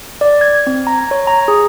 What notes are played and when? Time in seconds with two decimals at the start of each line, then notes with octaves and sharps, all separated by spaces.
0.21 D5
0.41 G#6
0.67 C4
0.87 A#5
1.11 C#5
1.27 A#5
1.48 G#4